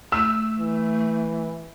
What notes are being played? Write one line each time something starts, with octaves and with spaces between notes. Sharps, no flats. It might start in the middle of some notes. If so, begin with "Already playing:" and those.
A3 E6
E3